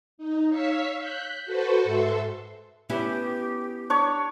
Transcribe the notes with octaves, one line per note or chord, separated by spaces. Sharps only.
D#4
C#5 F5 C#6 E6 B6
F#6 G6 B6
F#4 A4 B4 C5 C#6
G#2 A4 E5 C6
B3 C#4 E4 G4
D4 C#5 C#6